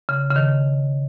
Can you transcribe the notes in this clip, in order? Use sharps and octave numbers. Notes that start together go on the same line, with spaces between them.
C#3
C#3
D#3